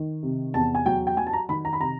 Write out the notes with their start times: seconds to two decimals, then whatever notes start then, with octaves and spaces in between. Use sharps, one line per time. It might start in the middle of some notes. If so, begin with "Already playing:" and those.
Already playing: D#3
0.23 C3
0.54 E2 A5
0.75 G#5
0.86 F#3 G5
1.07 G5
1.17 F#3 G#5
1.27 A5
1.33 A#5
1.49 D#3 B5
1.65 A#5
1.73 B5
1.80 C3 A#5